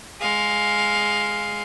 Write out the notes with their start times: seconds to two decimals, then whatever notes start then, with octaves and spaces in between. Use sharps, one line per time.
0.20 G#3 F5